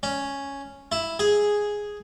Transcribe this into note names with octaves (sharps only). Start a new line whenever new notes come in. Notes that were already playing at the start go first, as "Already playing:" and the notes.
C#4
E4
G#4